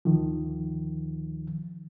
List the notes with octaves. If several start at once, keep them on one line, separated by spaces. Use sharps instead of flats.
D2 D#3 F3